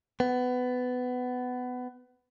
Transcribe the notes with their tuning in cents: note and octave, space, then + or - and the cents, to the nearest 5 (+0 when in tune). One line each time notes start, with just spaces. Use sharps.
B3 +20